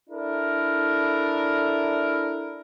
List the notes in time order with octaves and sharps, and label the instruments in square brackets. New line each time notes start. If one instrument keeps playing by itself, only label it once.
[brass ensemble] D4 E4 A4 A#4